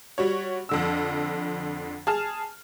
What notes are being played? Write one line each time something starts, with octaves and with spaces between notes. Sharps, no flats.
G3 F#4 C#5
F2 D3 E6
G#4 A5 F6